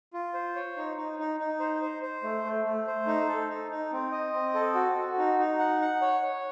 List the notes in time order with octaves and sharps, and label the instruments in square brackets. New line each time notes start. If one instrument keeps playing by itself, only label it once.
[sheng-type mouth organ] F4
C5
C#5
D#4
D#4
D#4
D#4
C5
C5
C5
A3
A3
A3
C5
D#4
A4
D#4
D#4
C4
D#5
C4
A4
F#4
F#4
D#4
D#4
F#5
F#5
C#5
C#5